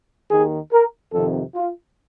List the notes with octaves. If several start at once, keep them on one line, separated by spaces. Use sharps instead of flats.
D#2 D#3 G#4
A#4
F2 C3 D#3 A4
F4